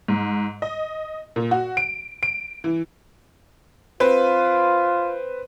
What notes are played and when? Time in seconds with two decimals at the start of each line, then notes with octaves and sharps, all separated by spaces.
0.08 G#2
0.62 D#5
1.36 A#2
1.51 F#4
1.77 D7
2.23 D7
2.64 E3
4.00 C4 F4 B4